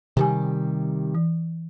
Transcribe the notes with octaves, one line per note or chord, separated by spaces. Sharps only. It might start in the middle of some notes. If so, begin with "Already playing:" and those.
C3 D#3 G3 G4 G#5
E3